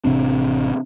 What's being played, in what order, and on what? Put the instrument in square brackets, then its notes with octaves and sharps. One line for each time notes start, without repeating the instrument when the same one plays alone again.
[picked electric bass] A1 C3 C4 D4